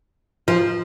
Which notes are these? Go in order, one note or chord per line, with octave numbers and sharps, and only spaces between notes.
F3